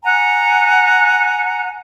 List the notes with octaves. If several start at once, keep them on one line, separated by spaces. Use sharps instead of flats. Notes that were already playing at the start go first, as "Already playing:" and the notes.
F#5 G#5 A#5